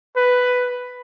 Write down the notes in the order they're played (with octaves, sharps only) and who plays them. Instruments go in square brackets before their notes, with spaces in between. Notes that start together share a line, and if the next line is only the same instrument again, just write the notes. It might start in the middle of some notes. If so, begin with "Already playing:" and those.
[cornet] B4